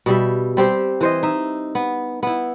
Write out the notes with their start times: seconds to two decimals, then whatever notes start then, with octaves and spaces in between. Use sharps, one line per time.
0.06 B2 G3 E5
0.57 G3 C4 G4 C5
1.01 E3 C5 D#5
1.23 D#4 E5
1.75 B3
2.23 B3 E4